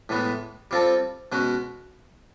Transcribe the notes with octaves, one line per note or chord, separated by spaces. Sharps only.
A2 E3 G#3 B3
G3 C4 F4 A4
B2 G#3 C#4 F#4